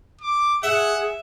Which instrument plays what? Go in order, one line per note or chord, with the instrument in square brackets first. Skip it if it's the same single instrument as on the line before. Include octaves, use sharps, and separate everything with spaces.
[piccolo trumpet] D6
[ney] G#4 [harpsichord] E5 [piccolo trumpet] F#5